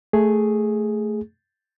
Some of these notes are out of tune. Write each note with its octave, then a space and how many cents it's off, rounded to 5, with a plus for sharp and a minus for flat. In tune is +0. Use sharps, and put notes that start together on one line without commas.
A3 +0 G#4 +0